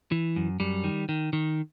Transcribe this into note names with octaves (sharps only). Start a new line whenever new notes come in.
E3
F#2
F#2 G3
D#3
D#3
D#3